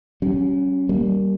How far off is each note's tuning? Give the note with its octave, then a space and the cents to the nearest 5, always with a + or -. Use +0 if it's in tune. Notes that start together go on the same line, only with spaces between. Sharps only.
G3 -45 C#4 +0
G3 -15 A#3 +0